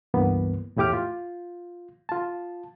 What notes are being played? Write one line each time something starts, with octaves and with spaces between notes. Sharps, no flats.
C#2 G2 E3 A#3 B3
E2 A2 E4 G4 D6 F6
F4
F4 A5